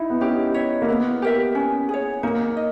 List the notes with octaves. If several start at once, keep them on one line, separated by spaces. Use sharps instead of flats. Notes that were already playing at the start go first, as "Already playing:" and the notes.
Already playing: D#4 E4
B3
C#4 G4
C#5 E5
A#3
B3 E4
G4 A#4 E5
C#4
G#4 C#5
A#3 D#4
D#5